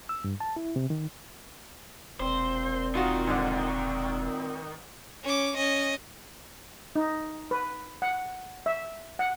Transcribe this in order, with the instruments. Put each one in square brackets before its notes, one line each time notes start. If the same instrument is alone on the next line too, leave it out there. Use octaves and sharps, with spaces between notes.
[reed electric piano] E6
G2
A5
E4
C3
D#3
[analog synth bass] E1 [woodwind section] A#2 C4 [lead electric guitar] C5
[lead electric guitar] D#3 [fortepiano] F4 F#4
[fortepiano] G#2 D3
[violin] C#4 D6
C#4 D#5
[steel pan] D#4
B4
F#5
E5
F#5